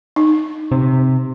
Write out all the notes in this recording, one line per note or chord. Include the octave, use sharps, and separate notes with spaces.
D#4
C3